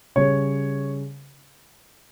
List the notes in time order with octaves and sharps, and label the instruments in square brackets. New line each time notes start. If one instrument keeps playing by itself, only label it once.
[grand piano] C#3 G3 C#5